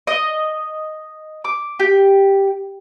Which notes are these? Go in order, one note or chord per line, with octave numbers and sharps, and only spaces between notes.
D#5
D6
G4